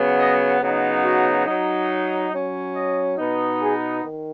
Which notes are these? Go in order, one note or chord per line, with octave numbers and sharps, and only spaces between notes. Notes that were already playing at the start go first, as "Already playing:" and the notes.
Already playing: C#3 F#3 B3
D#5
C#3 F#3 B3 D#4
F#4
F#3 D#4
F#3 C#4
D#5
B2 B3 D#4
G#4
D#3